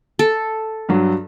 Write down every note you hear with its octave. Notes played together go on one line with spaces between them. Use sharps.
A4
G2 F#3